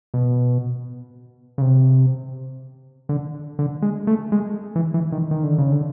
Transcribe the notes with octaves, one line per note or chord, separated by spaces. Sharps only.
B2
C#3
C3
D3
D3
G#3
A3
G#3
E3
E3
D#3
D#3
D3
C#3
D3